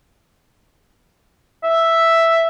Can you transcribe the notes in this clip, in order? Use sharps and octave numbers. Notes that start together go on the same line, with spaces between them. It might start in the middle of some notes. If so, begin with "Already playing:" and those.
E5